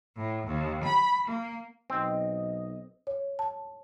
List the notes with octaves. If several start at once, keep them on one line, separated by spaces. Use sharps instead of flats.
A2
D#2
B5
A#3
B1 C4 D#5
C#5
A5